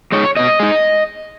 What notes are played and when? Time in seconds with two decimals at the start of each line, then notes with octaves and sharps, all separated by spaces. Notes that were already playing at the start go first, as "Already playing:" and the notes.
0.12 G#3 D#4 C#5
0.36 B2 D#5
0.59 G#3 D#4